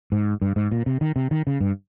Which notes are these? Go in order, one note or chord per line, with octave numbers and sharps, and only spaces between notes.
G#2
G2
G#2
A#2
C3
D#3
C3
D#3
C#3
G2